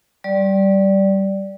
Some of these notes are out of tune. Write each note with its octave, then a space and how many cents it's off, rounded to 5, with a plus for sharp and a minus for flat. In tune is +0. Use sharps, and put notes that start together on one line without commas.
G3 -15 D5 -5